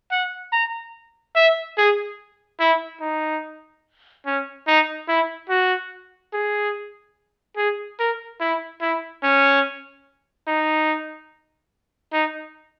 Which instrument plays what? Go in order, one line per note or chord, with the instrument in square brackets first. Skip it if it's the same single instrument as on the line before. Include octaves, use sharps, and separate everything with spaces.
[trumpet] F#5
A#5
E5
G#4
E4
D#4
C#4
D#4
E4
F#4
G#4
G#4
A#4
E4
E4
C#4
D#4
D#4